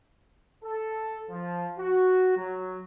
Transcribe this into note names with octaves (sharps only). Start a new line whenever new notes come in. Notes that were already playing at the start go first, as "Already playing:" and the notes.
A4
F3
F#4
F#3